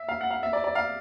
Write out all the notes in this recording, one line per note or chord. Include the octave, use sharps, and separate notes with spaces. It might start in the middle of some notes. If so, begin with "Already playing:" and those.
Already playing: E5
F5
F#5
F5
E5
D5
D5
F5